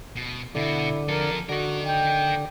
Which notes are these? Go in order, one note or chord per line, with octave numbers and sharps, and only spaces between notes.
B2
B2 D3 E4 F#4
F3 A4 A#4
D3 F#4 A#4 D#5
G5